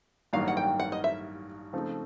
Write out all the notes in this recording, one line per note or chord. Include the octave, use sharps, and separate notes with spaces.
A1 G2 D#3 F#3 A#3 F5
F#5
G5
F#5
D#5
E5
C#3 F3 A3 C4 D#4